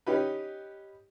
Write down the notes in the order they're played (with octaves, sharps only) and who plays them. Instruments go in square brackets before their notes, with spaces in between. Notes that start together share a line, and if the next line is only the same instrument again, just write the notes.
[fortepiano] C#4 D#4 G4 B4